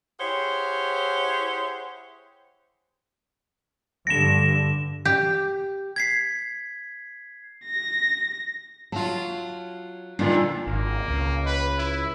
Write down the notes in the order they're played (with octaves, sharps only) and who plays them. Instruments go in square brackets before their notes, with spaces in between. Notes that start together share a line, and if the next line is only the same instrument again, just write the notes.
[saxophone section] E4 G4 G#4 C5 C#5 F#5
[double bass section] G2 D3 [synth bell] A#6 E7
[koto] G4
[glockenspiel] G#6 B6 C7
[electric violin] A#6
[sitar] F#3 F4 [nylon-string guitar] A5
[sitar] G2 A#2 D3 [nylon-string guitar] D4 D#4 F4
[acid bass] G#1 [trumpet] A#3
[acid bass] C#2
[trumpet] B4
E4